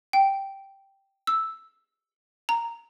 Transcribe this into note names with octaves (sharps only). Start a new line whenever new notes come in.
G5
E6
A#5